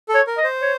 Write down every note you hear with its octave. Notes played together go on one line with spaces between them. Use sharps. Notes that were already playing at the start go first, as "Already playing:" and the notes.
A4
C#5
A#4
D#5
C5
C#5